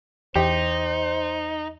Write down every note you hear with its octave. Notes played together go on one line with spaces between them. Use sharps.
E2 D#4 G4 C5